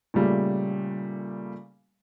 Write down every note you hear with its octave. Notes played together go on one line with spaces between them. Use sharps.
A#2 C#3 G3 A3